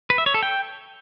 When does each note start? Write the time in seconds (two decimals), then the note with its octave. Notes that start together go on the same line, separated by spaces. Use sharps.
0.10 B4
0.18 E5
0.26 C#5
0.34 A4
0.43 G5